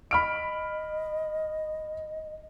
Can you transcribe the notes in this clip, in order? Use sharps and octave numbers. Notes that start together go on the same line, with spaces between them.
D#5 B5 F6 D7